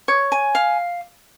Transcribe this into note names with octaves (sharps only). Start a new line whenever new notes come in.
C#5
G#5
F5